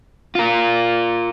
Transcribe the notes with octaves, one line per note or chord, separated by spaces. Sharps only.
F4 A#4